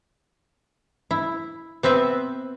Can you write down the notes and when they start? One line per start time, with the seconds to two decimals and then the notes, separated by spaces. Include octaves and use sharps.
1.11 E4
1.83 B3 C4 B4 E5